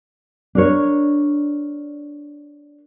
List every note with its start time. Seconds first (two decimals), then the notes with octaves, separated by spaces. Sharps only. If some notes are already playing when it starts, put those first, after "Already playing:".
0.55 D4 A#4 C#5